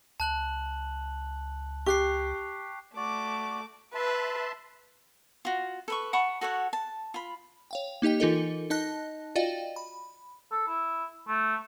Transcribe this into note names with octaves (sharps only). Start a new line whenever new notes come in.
C#2 A5 F#6 F#7
G4 C#6 F#6 C7
A3 F#4 D5 D6
B4 E5 A5 C6
F4 F#4
A4 B4 C#6
F#5 A5 B5 C#6
F#4 A4 C#5 F#5
A5
F4 B5
C#5 F5 G5
A#3 D#4 G4 D#5 G5
E3 D#4 F4 A4 A#4 D#5
D#4 D#5 A5 F#6 A#6
F4 F#4 D5 D#5 F5 G5
B5
A4
E4
A3